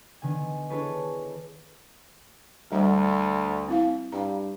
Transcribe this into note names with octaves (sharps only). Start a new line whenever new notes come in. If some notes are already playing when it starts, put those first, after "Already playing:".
D3 D#3 B3 G#5
D4 E4 G#4 A4 B4 C#5
D2 G3 A#5
C4 E4 F5
G2 F5 A#5